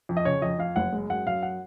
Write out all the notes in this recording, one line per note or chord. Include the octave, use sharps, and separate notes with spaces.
F2
D#5
C#3 C#5
F2 D#5
F2 F5
F#1 F#5
G#3
F#2 F#5
F#2 F5
F#5